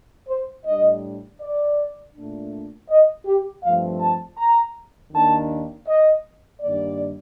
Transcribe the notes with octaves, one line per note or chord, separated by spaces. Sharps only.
C5
A2 G3 D4 D#5
D5
A#2 A3 D4
D#5
G4
G2 F3 A3 C4 F5
A5
A#5
D#2 D#3 A#3 D4 A5
D#5
G2 D#3 G3 A#3 D5